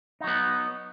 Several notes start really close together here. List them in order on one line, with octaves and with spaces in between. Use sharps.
D#4 F#3 B3